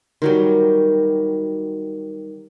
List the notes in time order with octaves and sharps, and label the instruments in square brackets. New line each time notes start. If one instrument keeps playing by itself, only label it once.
[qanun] D#3 F#3 G3